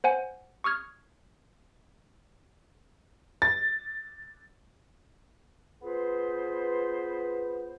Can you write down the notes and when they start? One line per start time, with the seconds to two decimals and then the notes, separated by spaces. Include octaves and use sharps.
0.04 C5 F#5 G#5
0.64 C#6 D#6 F6 G#6
3.42 A6
5.81 B3 F4 G#4 B4 C5